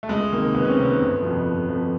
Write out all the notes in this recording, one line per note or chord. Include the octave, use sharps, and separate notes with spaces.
A3
C#2 G#3
C3 D#3 A#3
C#2 B3
C#4
C4
C3 D#3
B3
G1
F2 C3 F3
G1
F2 C3 F3